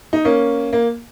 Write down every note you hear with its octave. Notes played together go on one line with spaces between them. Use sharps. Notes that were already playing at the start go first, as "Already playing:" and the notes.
D#4
A#3 C#4
A#3